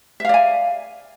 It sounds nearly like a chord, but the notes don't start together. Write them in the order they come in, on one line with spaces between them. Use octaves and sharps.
E5 F5 D5 G#5